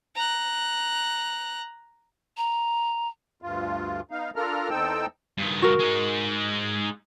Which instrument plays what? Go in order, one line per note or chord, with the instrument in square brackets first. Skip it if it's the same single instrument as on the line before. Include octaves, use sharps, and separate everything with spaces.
[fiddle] A#5 F#6
[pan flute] A#5
[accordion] D2 G2 F4
B3 D#4 F5
D4 F4 A4 A#4 A#5 F6
E2 C4 D#4 A4 G5 E6
[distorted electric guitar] G2 D#3
[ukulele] F#4 A#4
[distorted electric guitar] G#3 D#4